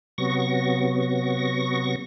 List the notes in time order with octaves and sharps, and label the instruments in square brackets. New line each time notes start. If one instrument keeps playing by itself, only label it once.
[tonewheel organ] C3 F#3 B3 C#6 A#6